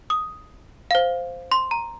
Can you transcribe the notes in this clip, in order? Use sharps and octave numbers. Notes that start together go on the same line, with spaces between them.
D#6
C5 F5
C6
A#5